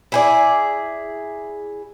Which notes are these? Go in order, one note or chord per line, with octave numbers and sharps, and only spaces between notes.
E4 G#4 D5